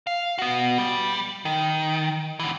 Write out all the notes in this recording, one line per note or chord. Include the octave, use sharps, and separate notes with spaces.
F5
B3 F#4
G3
D#3
D3 E3